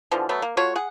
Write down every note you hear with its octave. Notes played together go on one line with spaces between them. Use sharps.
B2 D3 E3 F3
F#3 A3 B3
A#3
A3 F4 F#4 C#5
G#4 F#5